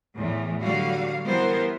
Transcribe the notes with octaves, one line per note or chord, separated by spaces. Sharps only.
E2 A2 E3
D3 F#3 G3 F#4 F5
E3 G3 B3 A#4 C5